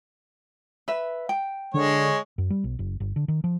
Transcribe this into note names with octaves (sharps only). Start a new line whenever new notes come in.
B4 E5
G5
D3 G#3 C#5
F#2
G3
B1
F#1
G1
D3
D#3
F3